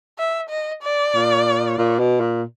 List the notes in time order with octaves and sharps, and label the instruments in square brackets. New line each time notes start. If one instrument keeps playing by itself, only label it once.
[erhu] E5
D#5
D5
[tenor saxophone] A#2
A#2
B2
A#2